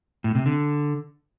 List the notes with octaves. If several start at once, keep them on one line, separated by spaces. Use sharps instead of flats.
A2
C3
D3